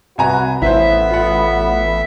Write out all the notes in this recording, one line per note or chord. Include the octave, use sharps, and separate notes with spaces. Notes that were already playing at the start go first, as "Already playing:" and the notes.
C2 F#4 B4 G#5 A#5
A1 A2 B3 E4 B4 C5 E5
F4 B4 F#5